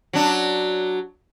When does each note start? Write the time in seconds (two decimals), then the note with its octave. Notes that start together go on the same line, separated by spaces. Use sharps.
0.13 F#3 D4